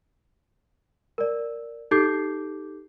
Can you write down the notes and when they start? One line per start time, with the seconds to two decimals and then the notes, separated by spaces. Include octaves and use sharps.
1.18 A#4 D5
1.91 D#4 G4 A4 D6 G6 C7